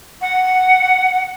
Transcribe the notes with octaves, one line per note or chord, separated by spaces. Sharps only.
F#5